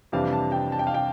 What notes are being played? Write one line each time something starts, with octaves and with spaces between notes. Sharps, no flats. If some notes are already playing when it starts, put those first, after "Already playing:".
F2 C3 E3 G3 D4 F5
A5
G5
A5
G5
F5
G5